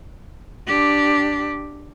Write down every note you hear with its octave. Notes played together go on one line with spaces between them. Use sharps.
D4 G4